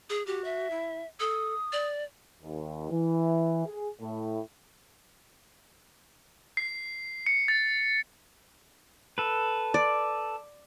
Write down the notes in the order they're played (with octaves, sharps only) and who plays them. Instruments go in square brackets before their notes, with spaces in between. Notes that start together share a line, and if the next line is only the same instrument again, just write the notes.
[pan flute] G#4
[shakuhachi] F#4 [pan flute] G4
[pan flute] E5
[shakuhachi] E4
[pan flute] A4 [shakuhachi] D#6
[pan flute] D5
[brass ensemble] D#2
E3
G#4
A2
[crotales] C7
C#7
A6
[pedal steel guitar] A4 B4
[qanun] D5